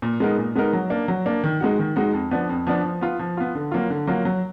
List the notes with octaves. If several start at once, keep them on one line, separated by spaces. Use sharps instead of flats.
A#2
G#3 B3 D#4 A#4
A#2
G#3 B3 D#4 A#4
F#3
A#3 D4
F#3
A#3 D4
D#3
G#3 D#4 F#4
D#3
G#3 D#4 F#4
F2
F3 B3 D4
F2
F3 B3 D4
F3
B3 F4
F3
B3 F4
D3
F#3 A#3 F4
D3
F#3 A#3 F4
F#3